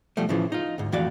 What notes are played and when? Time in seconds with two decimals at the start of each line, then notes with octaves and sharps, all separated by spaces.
0.17 B1 F3 G3 A3
0.29 A2 C#3 E3 F3
0.52 D#4 F4
0.78 D2 G#2
0.92 F2 A2 E3 F#4 D5 F5